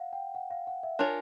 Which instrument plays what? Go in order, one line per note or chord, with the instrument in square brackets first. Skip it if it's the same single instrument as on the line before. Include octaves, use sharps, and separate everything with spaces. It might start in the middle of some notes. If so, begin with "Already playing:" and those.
Already playing: [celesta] F5 F#5
G5
F#5
F5
F#5
E5
[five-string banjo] D4 F4 A#4 C#5 [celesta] G#5